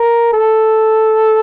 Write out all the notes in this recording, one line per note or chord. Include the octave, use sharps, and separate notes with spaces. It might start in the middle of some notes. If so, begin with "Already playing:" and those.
Already playing: A#4
A4